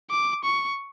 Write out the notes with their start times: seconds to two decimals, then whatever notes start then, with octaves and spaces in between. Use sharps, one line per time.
0.10 D6
0.44 C#6